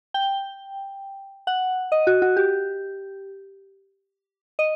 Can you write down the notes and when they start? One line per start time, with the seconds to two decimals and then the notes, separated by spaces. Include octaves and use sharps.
0.14 G5
1.47 F#5
1.92 D#5
2.07 F#4
2.22 F#4
2.37 G4
4.59 D#5